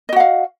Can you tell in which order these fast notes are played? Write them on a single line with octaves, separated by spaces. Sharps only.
D#5 F#4 F#5 F5